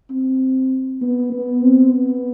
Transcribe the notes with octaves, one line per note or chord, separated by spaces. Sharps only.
C4
B3
B3
C4
B3